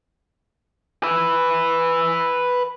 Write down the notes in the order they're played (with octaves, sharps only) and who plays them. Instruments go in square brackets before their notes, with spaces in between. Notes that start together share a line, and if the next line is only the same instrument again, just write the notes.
[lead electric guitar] B4 E5